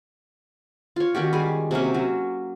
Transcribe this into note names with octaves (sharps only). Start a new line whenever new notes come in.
F4 C#5
D#3 C#4 F#4 G4
G3 G#3 G#4
C3 F#3 A#3 C#4
F#3